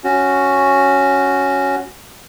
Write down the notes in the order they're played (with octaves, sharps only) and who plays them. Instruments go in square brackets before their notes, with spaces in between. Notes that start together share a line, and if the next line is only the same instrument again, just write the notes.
[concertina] C#4 F#4